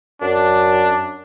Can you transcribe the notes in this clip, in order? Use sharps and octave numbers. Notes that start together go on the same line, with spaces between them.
F#2 D4